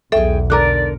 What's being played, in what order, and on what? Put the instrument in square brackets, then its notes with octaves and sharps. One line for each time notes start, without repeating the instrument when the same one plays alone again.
[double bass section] B1 E2 [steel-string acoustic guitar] G#4 G5 [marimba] A4 E5
[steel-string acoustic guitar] D3 A#4 [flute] D5 [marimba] A#5 D6 F#6